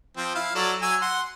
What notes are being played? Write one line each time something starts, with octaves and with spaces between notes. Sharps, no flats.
F3 C4
E4 F5
F#3 A4 D5
F#3 G#5 E6
F#5 C6